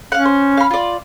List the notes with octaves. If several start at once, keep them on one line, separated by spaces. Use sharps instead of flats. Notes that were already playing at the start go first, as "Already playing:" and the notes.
C#4 F5 F#5
C5
F5 B5
F4 D5